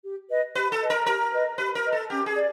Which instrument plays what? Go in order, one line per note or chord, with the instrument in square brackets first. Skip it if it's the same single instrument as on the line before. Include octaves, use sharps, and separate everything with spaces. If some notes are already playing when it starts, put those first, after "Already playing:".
[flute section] G4
B4 D#5
[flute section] G4 [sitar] B4
[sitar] A4
[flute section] B4 D#5
[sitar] A#4
[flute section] G4 [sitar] A#4
[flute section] B4 D#5
[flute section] G4 [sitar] B4
[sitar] A#4
[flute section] B4 D#5
[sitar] A4
[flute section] C#4 [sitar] G4
[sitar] G#4
[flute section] D5